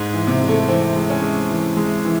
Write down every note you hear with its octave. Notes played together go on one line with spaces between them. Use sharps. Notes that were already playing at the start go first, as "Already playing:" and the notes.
Already playing: G#2 G#3
E3
C3
G#3
A3
E3 C4
G#3
C#4
G#3
E3
G#3
E3